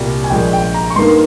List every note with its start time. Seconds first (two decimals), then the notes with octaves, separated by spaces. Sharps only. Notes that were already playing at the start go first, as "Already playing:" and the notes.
Already playing: C2 A#2 G3 A#3
0.24 G#5
0.30 A#1 A#2 G#3 G5
0.53 G5
0.74 A#5
0.90 C#6
0.96 G2 D#3 A#3 C6